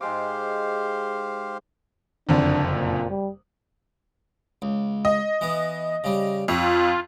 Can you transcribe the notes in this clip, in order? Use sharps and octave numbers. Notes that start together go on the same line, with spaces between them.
G#2 G#3 G4 C5 F5 D6
F#1 F2 D3 D4
A#2
G3
C#2
D#5
E3 B3
C#3 G3
F2 F4 C#5